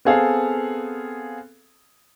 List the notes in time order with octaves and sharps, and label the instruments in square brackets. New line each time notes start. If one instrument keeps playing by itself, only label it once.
[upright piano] B3 C4 G#4 A4 F5